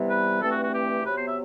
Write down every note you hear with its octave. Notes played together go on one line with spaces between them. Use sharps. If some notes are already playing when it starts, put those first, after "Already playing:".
Already playing: C3 E3 G3 B3
B4
G2 E3 A3 C4 A4
F#4
F#4
G4
C3 F#3 B3 B4
C5
E5